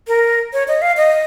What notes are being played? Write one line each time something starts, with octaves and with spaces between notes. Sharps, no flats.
A#4
C#5
D#5
F5
D#5